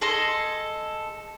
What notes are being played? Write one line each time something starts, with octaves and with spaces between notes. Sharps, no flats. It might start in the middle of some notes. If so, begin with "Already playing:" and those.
G#4 A4 D#5 C6